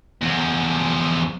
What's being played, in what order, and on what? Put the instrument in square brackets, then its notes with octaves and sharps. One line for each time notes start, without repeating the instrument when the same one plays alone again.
[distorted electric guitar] E2 F3